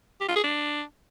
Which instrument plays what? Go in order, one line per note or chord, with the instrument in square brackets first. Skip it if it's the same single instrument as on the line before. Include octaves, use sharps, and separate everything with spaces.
[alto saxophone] G4
F4
G#4
D4